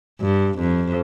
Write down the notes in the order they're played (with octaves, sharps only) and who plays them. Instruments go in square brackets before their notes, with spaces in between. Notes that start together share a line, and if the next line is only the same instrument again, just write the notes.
[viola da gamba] G2
F2